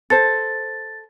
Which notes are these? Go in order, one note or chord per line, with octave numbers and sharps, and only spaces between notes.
A4 C5 A6